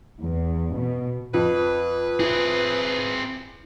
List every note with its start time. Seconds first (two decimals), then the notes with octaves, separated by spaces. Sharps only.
0.21 E2
0.76 B2
1.34 F2 B4
2.20 C4 E4 G#4